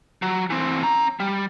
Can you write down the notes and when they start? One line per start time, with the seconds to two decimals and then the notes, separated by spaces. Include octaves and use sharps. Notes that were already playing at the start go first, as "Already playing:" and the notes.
0.22 F#3
0.50 E3 C4
0.83 C#4 A#5
1.20 G3